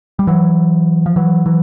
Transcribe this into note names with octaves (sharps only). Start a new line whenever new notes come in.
G3
E3 F#3
F3
E3 F#3
E3 F#3